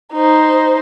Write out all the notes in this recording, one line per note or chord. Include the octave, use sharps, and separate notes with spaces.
D#4 C5